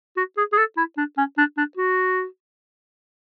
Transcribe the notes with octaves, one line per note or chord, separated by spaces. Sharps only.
F#4
G#4
G#4
A4
E4
D4
C#4
D4
D4
F#4